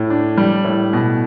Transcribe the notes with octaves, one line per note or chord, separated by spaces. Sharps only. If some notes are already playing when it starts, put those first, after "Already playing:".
Already playing: A2
D4
G3
A2
B2